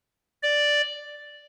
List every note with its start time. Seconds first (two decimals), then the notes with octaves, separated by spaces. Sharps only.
0.43 D5